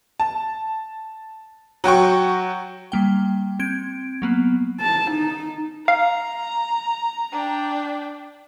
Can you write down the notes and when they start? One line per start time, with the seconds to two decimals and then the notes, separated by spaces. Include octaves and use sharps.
0.20 A5
1.84 F#3 F#4 G5 C#6
2.92 G3 A#3 G5
3.59 C4 G#6 D7
4.22 F#3 A#3 B3
4.81 A5
5.11 D#4
5.88 F5 A#5
7.32 D4 G5